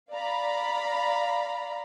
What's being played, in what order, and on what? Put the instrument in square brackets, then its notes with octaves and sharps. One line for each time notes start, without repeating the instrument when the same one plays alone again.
[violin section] D5 F5 A#5 B5